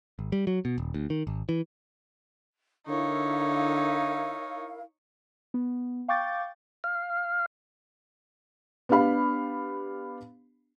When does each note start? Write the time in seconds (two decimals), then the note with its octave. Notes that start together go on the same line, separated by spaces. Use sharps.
0.19 G#1
0.32 G3
0.47 F#3
0.65 B2
0.78 D#1
0.94 D2
1.10 D#3
1.27 G#1
1.49 E3
2.87 D3 D#4 E4 A#4 C#5 F5
5.54 B3
6.08 F5 G5 C#6 D6 G6 A6
6.84 F5
8.89 B3 D4 G4 F5 B5